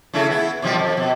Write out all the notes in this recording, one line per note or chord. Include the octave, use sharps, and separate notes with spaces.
C#3 A3 E4
B3 E4
B2 F3 G3
F2
B2